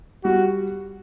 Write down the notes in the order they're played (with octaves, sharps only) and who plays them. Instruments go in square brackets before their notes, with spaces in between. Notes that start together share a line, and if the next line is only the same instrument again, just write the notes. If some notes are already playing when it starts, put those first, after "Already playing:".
[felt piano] G3 [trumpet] F#4